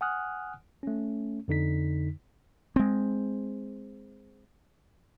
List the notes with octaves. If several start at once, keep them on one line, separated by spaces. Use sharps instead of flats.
F#5 G#5 D#6 F6 F#6
A3 C#4
F2 D3 D#4 B6
G#3 C4